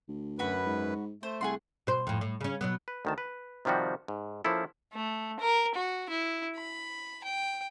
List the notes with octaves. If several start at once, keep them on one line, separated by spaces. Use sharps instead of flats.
D2
F#2 F#4 B4 B5
G#2
A3 C5
C2 G#4 F#5 C6
B2 C5
F2 A2
A2
C#3 C#4
B2 F#3 B3
B4
D2 D#3 A5
B4
C3 D#3 F3 G3 F#4
G#2
F3 A#3 C#4 E4 A4
A3
A#4
F#4
E4
B5
G5